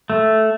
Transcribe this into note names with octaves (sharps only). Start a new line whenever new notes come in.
A3